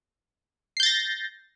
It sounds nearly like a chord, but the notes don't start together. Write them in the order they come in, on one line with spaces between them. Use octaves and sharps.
C7 G6 A6 A#6